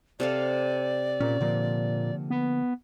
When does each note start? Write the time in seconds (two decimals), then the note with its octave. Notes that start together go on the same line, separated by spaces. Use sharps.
0.20 C3 A4 D5 F5
1.20 A#2 C#4
1.41 A#2 D3 F3 A#3
2.30 B3